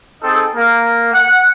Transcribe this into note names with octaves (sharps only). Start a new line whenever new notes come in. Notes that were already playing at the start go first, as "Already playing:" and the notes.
C4 D#4 G#4 A4
A#3
F#5